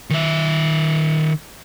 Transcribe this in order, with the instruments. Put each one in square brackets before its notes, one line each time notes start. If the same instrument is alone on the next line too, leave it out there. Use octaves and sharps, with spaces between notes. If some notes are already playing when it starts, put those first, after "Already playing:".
[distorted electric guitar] D#3 E5